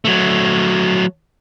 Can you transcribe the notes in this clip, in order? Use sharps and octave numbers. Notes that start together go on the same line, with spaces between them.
F#3 A3